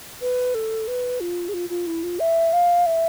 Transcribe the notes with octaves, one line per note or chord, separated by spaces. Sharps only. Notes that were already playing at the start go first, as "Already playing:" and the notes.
B4
A4
B4
F4
G#4
F4
F4
E4
F4
E5
F5
E5